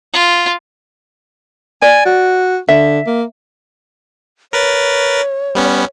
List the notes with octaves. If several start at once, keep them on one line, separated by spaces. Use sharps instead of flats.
F4
D5 G#5
F#4
D3 E5
A#3
A#4 B4 C#5 A6
G3 B3 C#4